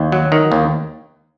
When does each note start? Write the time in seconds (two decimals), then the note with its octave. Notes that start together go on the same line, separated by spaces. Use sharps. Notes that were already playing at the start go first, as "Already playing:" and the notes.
Already playing: D#2
0.12 F#3
0.32 D#3
0.52 D#2